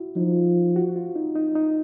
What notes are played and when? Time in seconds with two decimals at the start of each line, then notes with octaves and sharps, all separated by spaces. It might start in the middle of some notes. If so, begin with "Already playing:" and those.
Already playing: E4 F#4
0.16 F3 D#4
0.76 F#4
0.96 F4
1.15 D#4
1.35 D#4
1.56 D#4